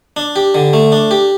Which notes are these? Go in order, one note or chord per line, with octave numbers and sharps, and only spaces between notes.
D4
G4
D3
A3
D4
G4